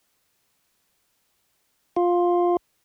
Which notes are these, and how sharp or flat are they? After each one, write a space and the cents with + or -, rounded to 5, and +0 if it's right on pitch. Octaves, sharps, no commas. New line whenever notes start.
F4 +10